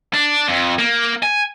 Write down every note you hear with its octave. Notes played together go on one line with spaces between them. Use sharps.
D4
F2
A#3
G#5